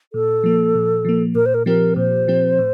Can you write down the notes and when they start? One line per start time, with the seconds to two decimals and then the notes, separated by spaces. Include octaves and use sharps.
0.13 A#2 A4
0.44 F3 A#3
0.75 A#2
1.05 F3 A#3
1.35 A#2 A#4
1.46 C5
1.54 A#4
1.66 F3 C4 G4 A#4
1.96 A#2 C5
2.28 F3 C4 G4
2.58 A2